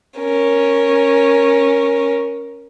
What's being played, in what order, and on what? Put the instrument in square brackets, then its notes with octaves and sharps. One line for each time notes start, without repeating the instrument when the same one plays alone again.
[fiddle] C#4 A#4